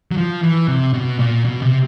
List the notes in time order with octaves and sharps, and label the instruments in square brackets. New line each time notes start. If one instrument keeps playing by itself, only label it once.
[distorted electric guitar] F#3
F3
E3
C3
B2
A#2
B2
C3